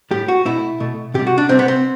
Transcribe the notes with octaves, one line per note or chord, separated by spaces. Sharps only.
A2 G3 G4
F#4
B2 A3 E4
B2 A3
C3 G3 G4
F#4
D4
C3 G3 C4
B3
C4